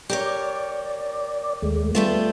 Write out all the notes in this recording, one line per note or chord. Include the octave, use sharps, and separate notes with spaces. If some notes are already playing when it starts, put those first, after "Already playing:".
G4 A#4 C#5 D5
D#2 G#3 A3
G3 A3 B3 F4